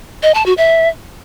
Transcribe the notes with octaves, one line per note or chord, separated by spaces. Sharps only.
D#5
A5
F#4
E5